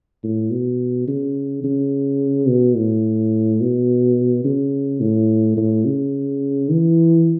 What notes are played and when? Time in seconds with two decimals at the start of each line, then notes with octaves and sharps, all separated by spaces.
0.24 A2
0.51 B2
1.08 C#3
1.64 C#3
2.48 B2
2.76 A2
3.61 B2
4.44 C#3
5.01 A2
5.57 A2
5.85 C#3
6.70 E3